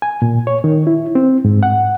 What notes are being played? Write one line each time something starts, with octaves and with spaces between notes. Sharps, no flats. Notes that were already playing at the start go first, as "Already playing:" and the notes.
G#5
A#2
C#5
D#3
E4
C4
G#2
F#5